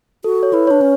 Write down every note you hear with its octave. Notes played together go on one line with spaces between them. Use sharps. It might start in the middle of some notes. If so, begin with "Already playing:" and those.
F#4 A4
C#5
E4 B4
D4 C#5
C#4